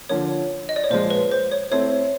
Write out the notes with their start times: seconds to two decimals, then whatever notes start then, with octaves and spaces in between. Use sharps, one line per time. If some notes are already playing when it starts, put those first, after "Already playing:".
0.09 D3 F3 A#3 C#5
0.69 D#5
0.76 D5
0.84 C#5
0.90 A#2 F3 G#3 C5
1.10 B4
1.31 C5
1.52 C#5
1.71 A3 C4 E4 A4 C5 C#5